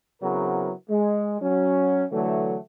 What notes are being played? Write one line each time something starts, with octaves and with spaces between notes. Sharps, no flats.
C#3 F#3 B3 C4 E4 A#4
G#3
F#3 C#4
D3 E3 F#3 A3